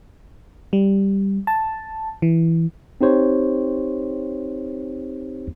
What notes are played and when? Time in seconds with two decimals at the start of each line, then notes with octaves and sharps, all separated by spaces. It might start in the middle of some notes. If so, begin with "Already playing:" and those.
0.73 G3
1.47 A5
2.22 E3
3.01 C4 D#4 G4 C5 C#5